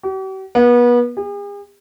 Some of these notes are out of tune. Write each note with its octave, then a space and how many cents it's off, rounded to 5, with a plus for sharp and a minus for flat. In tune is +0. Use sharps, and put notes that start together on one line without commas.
G4 -45
B3 -30
G#4 -45